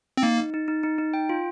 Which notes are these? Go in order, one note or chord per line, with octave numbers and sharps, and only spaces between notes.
C4
A#3 D#4
D#4
D#4
D#4
D#4
D#4
G5
F4